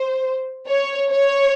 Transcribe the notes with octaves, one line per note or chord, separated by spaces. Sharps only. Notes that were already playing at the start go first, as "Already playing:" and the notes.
Already playing: C5
C#5
C#5